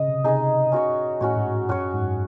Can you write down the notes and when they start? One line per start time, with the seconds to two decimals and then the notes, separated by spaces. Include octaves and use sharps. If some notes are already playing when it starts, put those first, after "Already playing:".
Already playing: C#3 D#5
0.08 C3
0.24 C3 D#4 G#4 D#5
0.72 C#4 F#4 C#5
1.21 A2 C#4 F#4 C#5
1.36 G#2
1.69 F#2 C#4 F#4 C#5
1.94 G#2
2.01 F#2